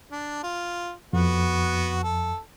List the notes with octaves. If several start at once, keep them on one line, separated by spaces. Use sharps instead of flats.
D4
F4
F2 B3 F#4
A4